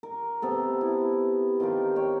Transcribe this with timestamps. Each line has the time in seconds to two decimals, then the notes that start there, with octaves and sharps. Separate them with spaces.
0.03 A#4
0.42 C3 B3 A4
0.81 E4
1.60 D#3 F4 G4 A#4
1.95 C#5 D#5 G5